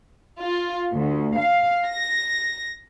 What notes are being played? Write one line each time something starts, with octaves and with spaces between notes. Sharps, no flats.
F4
D2
F5
A#6